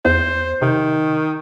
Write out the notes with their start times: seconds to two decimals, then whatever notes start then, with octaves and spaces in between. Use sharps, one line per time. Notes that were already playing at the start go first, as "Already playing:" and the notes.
0.05 E2 C5
0.62 C3 D#3